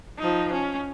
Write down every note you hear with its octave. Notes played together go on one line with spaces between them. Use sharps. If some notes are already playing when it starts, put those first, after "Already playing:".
F3 D#4
C#4